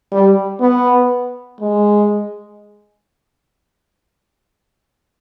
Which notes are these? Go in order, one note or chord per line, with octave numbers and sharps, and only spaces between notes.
G3
B3
G#3